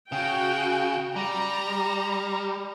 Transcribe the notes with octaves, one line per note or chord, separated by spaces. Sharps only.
C#3 F#4 G5
G3 A#5